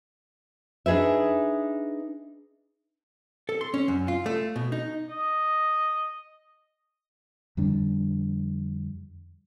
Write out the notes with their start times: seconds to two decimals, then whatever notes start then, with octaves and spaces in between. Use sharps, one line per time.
0.86 D4 D#4 G#4 B4 E5
3.49 A4
3.61 C6
3.74 C#4
3.88 F#2
4.08 F4
4.26 A3
4.56 B2
4.72 D#4
5.09 D#5
7.57 F2 D3 G3 D4